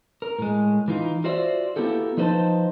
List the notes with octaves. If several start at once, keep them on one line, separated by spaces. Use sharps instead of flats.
A#4
A2 G#3
E3 D#4 F4
F4 F#4 C5 D5 E5
A#3 B3 E4 F#4 G4 A4
F3 D#4 B4 C5 D#5 A5